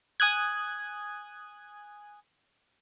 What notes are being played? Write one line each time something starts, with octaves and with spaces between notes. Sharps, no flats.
G#5 D#6 F#6 G#6